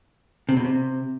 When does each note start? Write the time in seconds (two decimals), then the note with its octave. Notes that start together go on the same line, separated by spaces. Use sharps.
0.49 C3
0.57 B2
0.65 C3